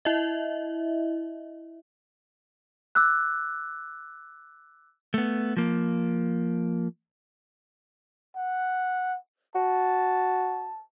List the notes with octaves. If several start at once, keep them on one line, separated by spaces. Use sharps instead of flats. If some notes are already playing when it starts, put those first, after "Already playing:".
E4 D#5 E5
D6 E6 F#6
A3 B3
F3 A#3
F#5
F#4 A5